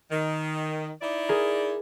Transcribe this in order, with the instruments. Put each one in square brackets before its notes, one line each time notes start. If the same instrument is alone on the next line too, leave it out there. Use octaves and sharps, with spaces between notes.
[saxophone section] D#3
D#4 E4 D5
[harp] G#4 A#4